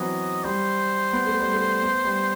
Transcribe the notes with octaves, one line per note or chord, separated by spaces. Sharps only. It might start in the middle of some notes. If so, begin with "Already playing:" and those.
Already playing: E3 F#3 B3 C4 D#5
G3 C5
B3
A3
G3
A3
B3
G3